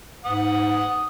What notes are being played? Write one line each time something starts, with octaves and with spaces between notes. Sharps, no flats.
G#2 F#5 D#6